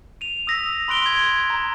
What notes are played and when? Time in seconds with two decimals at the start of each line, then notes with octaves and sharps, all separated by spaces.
0.21 D#7 F7
0.47 D#6 E6 A#6 B6
0.88 B5 C6 F#6 D7 G7
1.06 G#6
1.50 A#5